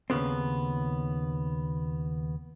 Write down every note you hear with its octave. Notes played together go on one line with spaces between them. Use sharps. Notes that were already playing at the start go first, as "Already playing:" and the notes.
D#2 C#3 B3 C4